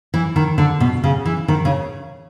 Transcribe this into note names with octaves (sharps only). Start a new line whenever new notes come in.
E3
D#3
D3
B2
C#3
E3
D#3
C#3